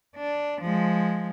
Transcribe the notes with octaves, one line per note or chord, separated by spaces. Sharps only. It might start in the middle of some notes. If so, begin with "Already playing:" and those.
D4
F3 G#3